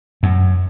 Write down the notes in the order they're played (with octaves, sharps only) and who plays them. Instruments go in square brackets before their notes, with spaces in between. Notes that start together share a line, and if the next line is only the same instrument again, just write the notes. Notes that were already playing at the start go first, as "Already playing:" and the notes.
[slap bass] F#2